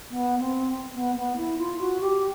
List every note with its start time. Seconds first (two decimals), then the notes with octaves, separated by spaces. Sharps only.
0.10 B3
0.39 C4
0.95 B3
1.16 B3
1.37 E4
1.58 F4
1.79 F#4
2.00 G4